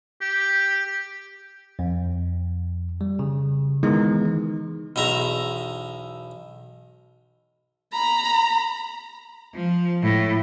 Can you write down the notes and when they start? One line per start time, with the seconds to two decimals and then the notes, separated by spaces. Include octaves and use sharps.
0.21 G4
1.79 F2
3.01 G3
3.19 C#3
3.83 D#3 E3 G#3 B3 D#4
4.96 B1 E2 E5 A#5
7.93 A#5 B5
9.54 F3
10.02 A2